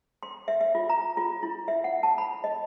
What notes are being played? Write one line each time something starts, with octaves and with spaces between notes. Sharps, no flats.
C6
E5
E5
F4
A#5
F4
E4
E5
F#5
A5
B5
D#5